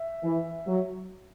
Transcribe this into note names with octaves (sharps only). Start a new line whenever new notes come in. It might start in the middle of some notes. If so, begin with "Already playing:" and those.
Already playing: E5
E3
F#3